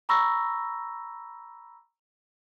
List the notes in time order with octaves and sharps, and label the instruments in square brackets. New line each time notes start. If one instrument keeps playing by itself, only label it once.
[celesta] A#5 B5 C#6 E6 A#6